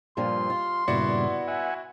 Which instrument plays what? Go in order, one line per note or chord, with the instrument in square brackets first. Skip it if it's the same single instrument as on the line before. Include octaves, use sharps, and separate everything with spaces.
[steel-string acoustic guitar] G2 A#2 F3 [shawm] C6
[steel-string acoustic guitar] F4
[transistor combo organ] G2 A#2 C#3 [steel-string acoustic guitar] B3 D5 [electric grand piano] E4 F#4 C#7
[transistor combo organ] E5 F#5 G#5